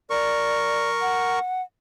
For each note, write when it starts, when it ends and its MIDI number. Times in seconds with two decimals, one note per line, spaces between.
0.10 1.39 70
0.10 0.90 74
0.10 1.39 85
1.01 1.62 78